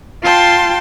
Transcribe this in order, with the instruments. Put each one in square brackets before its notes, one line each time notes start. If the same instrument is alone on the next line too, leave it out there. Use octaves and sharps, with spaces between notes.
[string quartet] F4 G5 A5 C6